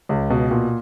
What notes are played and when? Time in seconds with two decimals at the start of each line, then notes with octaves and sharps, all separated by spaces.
0.09 C#2
0.30 B2
0.51 A#2